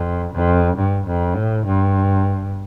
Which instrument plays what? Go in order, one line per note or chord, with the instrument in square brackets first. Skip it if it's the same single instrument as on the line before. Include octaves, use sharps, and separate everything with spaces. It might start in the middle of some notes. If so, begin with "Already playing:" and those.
Already playing: [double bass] F2
F2
G2
F2
A2
G2